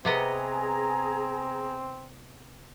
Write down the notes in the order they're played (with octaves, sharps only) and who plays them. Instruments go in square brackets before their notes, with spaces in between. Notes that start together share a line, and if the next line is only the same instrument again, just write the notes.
[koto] C3 B3 D#5 [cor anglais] C4 [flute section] G#4 A#5